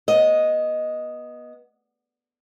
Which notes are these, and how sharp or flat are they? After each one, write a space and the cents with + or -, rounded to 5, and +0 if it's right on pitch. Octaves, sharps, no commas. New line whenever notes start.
B3 -30 D#5 +0